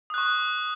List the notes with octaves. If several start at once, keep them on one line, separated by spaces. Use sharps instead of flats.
C#6 D#6 F#6